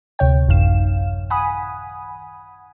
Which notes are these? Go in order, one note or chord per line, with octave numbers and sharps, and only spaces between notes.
D2 C3 C#5 G5
A1 F#2 D#3 F5 E7
F#5 G#5 B5 D#6